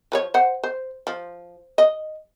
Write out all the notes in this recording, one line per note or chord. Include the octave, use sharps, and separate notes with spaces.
F3 B4 C#5
C5 F#5
C5
F3
D#5